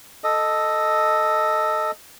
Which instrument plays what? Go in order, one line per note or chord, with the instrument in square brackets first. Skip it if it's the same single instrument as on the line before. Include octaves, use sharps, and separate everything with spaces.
[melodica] A4 D#5